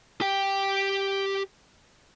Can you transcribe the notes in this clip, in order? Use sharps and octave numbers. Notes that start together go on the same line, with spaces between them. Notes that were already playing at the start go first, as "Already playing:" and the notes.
G4 G5